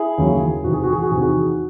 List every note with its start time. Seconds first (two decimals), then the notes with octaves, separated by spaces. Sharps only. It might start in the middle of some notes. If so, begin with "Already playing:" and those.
Already playing: E4 G#4
0.18 D#2 C#3 F#3
0.64 E2 C3 D#3 F#4
0.73 G#4
0.83 F#4
0.92 G#4
1.02 F#4
1.10 E2 C3 D#3 G#4
1.21 D#4 F#4